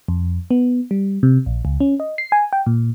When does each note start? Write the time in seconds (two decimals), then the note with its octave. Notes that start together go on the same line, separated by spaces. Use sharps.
0.08 F2
0.51 B3
0.91 G3
1.23 C3
1.46 A#1
1.65 C#2
1.80 C#4
2.00 D#5
2.18 C7
2.32 G#5
2.53 G5
2.66 A#2